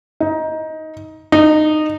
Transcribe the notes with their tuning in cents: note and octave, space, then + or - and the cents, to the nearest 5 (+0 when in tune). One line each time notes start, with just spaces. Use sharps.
D#4 +15
D#4 -20